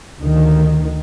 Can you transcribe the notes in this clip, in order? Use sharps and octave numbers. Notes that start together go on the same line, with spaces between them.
D2 D#3